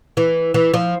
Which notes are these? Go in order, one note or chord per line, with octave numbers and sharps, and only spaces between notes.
E3
E3
F3